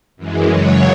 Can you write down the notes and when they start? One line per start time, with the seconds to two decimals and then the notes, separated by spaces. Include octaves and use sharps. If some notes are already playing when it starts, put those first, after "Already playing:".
0.17 F#2 E3 G#3
0.51 F#2 C#3 F#3 C#5